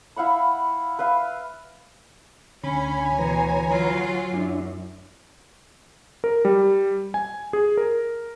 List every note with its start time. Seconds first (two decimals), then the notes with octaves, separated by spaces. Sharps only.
0.16 E4 F5 F#5 B5
0.99 B4 E5 F5
2.64 D2 D3 C#4 C#5 G#5 B5
3.19 B2 E3 B4 A#5
3.68 F#3 F4
4.34 F#2 D4 E4
6.24 A#4
6.45 G3
7.14 G#5
7.53 G#4
7.77 A#4